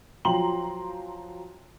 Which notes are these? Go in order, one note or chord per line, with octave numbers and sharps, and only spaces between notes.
F3 F#3 G5 A#5 C6 F#7